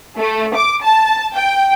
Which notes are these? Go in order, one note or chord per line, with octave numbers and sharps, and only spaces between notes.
A3
D6
A5
G5